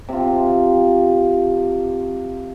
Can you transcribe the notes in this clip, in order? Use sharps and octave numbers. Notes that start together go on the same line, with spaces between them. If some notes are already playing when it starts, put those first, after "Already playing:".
C3 F4